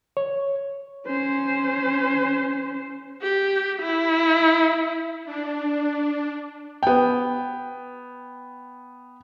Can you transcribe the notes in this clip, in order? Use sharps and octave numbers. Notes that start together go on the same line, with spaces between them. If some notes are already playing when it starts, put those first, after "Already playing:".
C#5
C#4 C5
G4
E4
D4
B3 G5